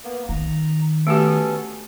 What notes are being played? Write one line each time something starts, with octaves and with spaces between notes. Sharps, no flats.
A#3 B3
D#3 A#5
A3 B3 C#4 F#4 G4 A4